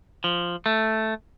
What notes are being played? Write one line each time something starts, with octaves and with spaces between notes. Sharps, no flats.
F3
A3